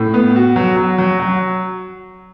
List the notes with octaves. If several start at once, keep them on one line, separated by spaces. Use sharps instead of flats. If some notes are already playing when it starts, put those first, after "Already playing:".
Already playing: A2
B3
F#4
F#3
F#3
F#3
F#3